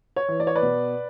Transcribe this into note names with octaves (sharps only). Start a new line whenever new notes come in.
C#5
E3
D5
C#5
B4 D5
B2